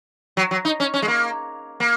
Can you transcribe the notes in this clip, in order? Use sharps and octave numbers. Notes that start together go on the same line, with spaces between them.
F#3
F#3
D#4
C#4
C#4
G#3
A#3
A#3